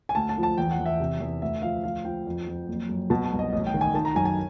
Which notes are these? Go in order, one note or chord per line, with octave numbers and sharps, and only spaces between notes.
G#5
D2 A5
A5
F3
A5
E2 G5
F#5
E2
E5
C3
E2
D2 E5
F3 F5
F3 F5
F3 G5
F2
F2
F#1
F#2
B2 A5
A5
C2
D#5
A1 D#5
G5
D#3
G#5
D#3 A5
A#5
F#2 G#5
G#5